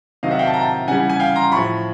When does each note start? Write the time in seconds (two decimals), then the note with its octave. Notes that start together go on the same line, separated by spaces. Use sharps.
0.23 C3 D#3 F#3 D#5 F5
0.31 E5 F#5
0.39 F5 G5
0.47 A5
0.54 A#5
0.61 G5 A5
0.87 C#3 E3 G3 F#5 G#5
1.09 G#5
1.19 F5 G5
1.36 A#5 C6
1.52 A2 F3 B5 C#6